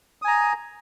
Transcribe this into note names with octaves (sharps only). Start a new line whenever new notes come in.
G#5 A#5 D#6